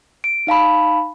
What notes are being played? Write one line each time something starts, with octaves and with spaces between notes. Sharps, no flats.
D7
D#4 F5 A5 B5